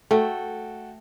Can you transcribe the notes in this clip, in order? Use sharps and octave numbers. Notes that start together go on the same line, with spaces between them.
A3 F#4 A4 G5